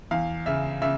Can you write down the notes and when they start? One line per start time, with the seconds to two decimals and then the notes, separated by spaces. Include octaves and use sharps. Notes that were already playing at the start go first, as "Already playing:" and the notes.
0.11 E2 F5
0.46 C#3 E5
0.82 C#3 E5